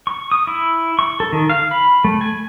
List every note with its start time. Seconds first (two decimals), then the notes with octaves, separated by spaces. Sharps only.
0.07 C#6
0.31 D#6
0.47 E4
0.99 C#6
1.20 A4
1.33 D#3
1.50 F5
1.71 B5
2.05 A3
2.21 G#5